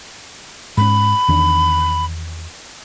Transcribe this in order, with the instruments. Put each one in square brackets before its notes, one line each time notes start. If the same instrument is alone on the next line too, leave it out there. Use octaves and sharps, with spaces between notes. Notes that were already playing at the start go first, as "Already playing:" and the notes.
[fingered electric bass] G#2 C#4 [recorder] B5
[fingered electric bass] E2 D#3 D4